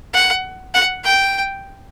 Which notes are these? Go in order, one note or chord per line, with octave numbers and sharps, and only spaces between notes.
F#5
F#5
G5